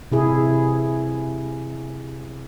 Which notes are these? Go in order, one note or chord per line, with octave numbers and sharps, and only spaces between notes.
C3 E4 G#4